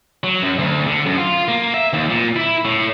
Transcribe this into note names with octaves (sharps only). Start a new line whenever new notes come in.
F#3
F#2
D2
D3
F#2
F4
A#3
E5
D#2
A#2
E4
A2